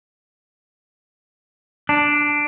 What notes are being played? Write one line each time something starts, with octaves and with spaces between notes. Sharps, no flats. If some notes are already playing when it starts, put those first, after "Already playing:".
D4